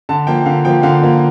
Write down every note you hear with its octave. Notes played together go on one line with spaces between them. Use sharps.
D3 A5
F3 A#3 G5
D3 F5
F3 A#3 G5
D3 F5
F3 A#3